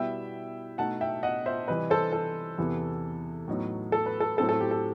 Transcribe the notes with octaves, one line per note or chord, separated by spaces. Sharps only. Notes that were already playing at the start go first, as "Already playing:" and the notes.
Already playing: B2 G3 B3 E4 E5 G5
B2 A3 D#4 F#5 A5
E5 G5
D#5 F#5
C5 E5
C3 E3 G3 B4 D#5
A4 C5
A4
E2 C3 E3 B3 E4
A2 F#3 B3 D#4
A4
B4
A4
A2 F#3 C4 E4 A4
A4
G4
A4